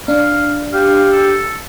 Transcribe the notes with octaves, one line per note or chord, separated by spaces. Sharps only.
D4 F5
G4 F5
A4